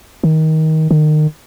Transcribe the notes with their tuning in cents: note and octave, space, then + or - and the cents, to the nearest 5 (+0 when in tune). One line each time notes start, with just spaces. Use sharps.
D#3 +20
D#3 -30